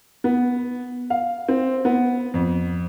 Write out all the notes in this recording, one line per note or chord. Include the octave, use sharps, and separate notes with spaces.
B3
F5
C4
B3
F2